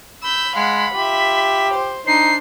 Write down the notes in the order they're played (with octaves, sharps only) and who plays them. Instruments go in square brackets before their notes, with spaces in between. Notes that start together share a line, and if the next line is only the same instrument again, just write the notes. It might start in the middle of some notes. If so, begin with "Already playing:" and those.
[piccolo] B5 [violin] E6 G6
[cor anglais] G#3 [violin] F5 F#5
[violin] F4 E5 [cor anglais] G4
[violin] C5
[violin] D4 C5 [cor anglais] D#4 [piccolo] C7